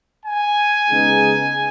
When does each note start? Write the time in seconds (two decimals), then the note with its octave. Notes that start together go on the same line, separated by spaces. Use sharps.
0.24 G#5
0.90 C#3 G#3 B3 D#4